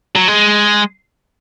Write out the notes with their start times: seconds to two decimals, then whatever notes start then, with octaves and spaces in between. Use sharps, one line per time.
0.16 F#3
0.28 G#3